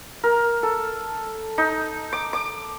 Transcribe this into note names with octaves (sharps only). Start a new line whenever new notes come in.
A#4
A4
D#4
D6
D6